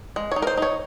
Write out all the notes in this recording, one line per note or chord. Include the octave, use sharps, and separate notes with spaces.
G#3
D#4 C#5
A#4
C5
D#4 C#5